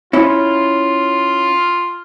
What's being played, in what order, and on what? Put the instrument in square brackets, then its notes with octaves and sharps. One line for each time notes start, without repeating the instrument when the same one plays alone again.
[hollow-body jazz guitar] C#4 E4 [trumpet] F4